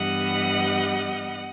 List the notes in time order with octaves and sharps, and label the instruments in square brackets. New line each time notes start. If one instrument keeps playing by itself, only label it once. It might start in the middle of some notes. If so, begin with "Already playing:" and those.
Already playing: [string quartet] G2 E3 G3 B3 D#5 F#5